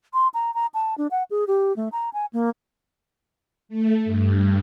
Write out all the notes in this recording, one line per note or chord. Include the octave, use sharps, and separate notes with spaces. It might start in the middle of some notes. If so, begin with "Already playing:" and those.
C6
A#5
A#5
A5
D4
F#5
G#4
G4
A3
A#5
G#5
A#3
A3
G2